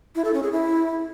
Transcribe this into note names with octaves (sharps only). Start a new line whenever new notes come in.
E4
A4
C#4
G#4
E4